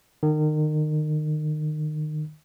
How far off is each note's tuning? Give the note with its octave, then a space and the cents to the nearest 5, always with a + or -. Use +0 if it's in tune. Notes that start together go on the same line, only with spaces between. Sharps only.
D#3 -30